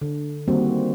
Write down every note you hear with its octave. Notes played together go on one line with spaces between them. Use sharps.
D3
D#3 G3 A#3 C4 F#4